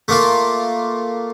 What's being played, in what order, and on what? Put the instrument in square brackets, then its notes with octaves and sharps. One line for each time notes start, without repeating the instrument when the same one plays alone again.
[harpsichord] A3 A#3 F4